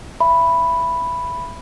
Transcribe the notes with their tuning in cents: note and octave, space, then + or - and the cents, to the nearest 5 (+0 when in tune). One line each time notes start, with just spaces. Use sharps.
E5 +20 B5 +0